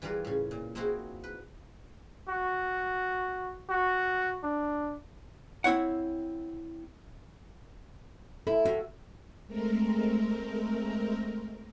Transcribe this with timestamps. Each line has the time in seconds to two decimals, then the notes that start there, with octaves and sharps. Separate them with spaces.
0.02 E3 G3 F4 G#4 A#4 B4
0.25 A2 C#3
0.51 A#2
0.75 A#3 C4 D#4 E4 F#4 G#4
1.24 B4
2.28 F#4
3.70 F#4
4.43 D4
5.64 C4 E4 C#5 F#5
8.47 E4 A4
8.65 A2 F#4
9.47 G#3 A3 C4 A#4